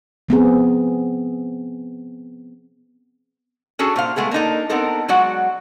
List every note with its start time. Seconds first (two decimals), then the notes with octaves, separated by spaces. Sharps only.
0.29 F3 B3 C4 G#4
3.79 C#4 D4 F#4 G#4 A4
3.96 A#2 C5 F5
4.16 G#3 A3 B3 G#4
4.31 A#3 D4 D#4 A4
4.69 B3 C4 D#4 A4 A#4
5.08 F#3 G#3 F#4 D5 F#5